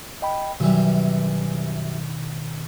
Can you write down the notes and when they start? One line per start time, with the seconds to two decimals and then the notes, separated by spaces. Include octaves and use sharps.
0.22 D#5 G5 B5
0.60 F#2 B2 D#3 E3 G3